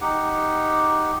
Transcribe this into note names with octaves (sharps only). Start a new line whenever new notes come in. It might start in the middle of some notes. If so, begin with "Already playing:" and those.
D#4 G4 F#5